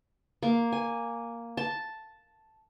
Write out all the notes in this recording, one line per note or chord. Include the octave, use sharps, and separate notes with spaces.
A#3
G#5
A5